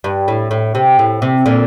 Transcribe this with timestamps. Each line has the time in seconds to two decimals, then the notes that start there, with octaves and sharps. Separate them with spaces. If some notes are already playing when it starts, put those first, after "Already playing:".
0.04 G2
0.28 A2
0.51 A2
0.75 C3
0.99 A2
1.22 C3
1.46 A#2 D3